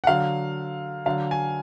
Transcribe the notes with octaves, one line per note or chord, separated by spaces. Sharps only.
F#5
D3 F#3 F5
D3 F#3 F5
G#5